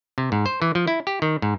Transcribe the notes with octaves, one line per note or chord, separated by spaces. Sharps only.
C3
G#2
C5
E3
F3
E4
G4
D#3
G#2